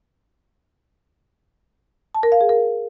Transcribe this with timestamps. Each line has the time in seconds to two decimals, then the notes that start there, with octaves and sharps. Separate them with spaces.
2.15 A5
2.23 A#4
2.32 F5
2.41 G#4
2.49 A#4